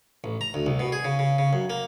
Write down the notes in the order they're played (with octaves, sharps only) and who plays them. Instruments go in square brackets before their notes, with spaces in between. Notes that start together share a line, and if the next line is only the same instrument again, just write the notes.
[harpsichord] A1
A#5
D2
C2
B2
G#4
C#3
C#3
C#3
F#2
A#3